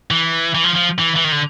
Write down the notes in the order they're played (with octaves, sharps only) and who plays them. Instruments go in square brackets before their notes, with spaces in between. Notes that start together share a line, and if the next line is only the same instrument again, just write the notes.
[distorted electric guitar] E3
E3
F3
F3
E3
E3
D#3
D3